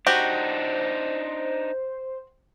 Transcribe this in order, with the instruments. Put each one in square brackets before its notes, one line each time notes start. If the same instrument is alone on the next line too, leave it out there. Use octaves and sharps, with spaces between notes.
[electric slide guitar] D4 D#4 [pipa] F#4 [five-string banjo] G4 [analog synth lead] C5